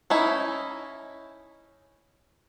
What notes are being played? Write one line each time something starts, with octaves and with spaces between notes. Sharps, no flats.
C#4 D#4 E4